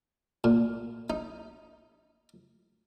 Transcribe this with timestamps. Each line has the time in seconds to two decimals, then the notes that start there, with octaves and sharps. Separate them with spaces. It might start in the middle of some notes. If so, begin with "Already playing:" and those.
0.44 A#2
1.10 D#4